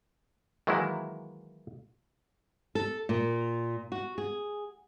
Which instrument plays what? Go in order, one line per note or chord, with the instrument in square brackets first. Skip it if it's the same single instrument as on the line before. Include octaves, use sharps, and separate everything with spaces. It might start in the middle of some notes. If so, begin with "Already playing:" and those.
[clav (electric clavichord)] D#3 E3 F#3 G#3 A#3 E4
[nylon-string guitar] A4
A#2
F#4
G#4